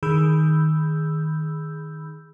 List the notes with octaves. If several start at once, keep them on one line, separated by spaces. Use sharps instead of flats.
D#3 G#4 B5 E6 G6